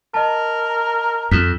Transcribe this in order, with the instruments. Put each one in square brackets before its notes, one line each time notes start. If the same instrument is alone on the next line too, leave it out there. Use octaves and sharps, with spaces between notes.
[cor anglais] A#4 [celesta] D#5 A5
[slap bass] F2 [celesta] B6 E7